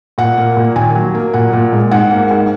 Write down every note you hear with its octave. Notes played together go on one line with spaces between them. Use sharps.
A#2 F#5
A#3
A#2
D#2 G#5
F#3
A#3
A#2 F#5
A#2
G#3
G#2 F#5
A#3
G#2